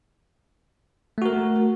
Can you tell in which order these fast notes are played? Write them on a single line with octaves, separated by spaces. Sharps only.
A3 F#4 A#4